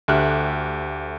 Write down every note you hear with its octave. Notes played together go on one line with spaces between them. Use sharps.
D2 A3 G4 E5 F6 F#6